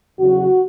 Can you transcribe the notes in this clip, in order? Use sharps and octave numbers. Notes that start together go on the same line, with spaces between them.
E2 C#3 F#3 F#4